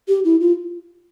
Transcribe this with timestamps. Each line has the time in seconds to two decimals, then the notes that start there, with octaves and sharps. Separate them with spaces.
0.08 G4
0.25 E4
0.41 F4